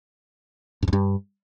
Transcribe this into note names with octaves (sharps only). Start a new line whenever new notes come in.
G2
F2
G2